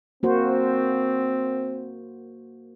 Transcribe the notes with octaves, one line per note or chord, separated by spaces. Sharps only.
A#3 C4 F#4 C5